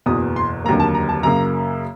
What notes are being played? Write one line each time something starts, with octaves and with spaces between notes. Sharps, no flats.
F#1 E2 B2 D#6
C6
F1 D#2 D3 F#3 A#3 A#5
A5
A#5
A5
F#2 C#3 F#3 A#3 A#5